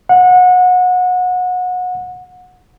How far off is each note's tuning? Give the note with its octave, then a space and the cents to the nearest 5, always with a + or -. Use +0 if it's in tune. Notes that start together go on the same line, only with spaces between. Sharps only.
F#5 -25